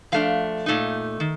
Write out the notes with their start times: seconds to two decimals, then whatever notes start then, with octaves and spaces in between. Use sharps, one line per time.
0.12 F3 A3 D4 F5
0.66 A#2 A3 D#4
1.20 D#3